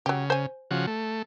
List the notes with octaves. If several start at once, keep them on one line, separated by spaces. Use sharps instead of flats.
C#3 F#3 G4
C5 G#5
C#3 F3 F#4
A3